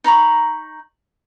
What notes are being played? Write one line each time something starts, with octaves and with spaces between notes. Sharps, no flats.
D#4 A#5 B5 C#6